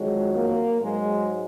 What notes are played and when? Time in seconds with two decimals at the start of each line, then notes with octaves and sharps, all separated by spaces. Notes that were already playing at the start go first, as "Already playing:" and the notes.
Already playing: F2 D#3 F#3 G#3
0.32 A#3
0.81 G#2 F#3 G#3